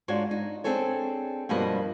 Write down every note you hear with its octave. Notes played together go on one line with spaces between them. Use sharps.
G#2 D4 F4 F#4 C#5
D#4
C4 D4 G#4 A4 C#5
G2 B2 F3 A#3 B4 D#5